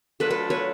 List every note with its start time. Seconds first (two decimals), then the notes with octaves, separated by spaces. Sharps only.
0.20 F#3 A3 D4 F4 A4 B4
0.30 A4 B4
0.50 B4 C#5